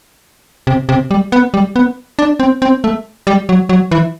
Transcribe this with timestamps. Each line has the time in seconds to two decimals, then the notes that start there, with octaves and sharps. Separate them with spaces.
0.67 C3
0.89 C3
1.11 G3
1.32 B3
1.54 G3
1.76 B3
2.19 D4
2.40 C4
2.62 C4
2.84 A3
3.27 G3
3.49 F#3
3.69 F#3
3.91 E3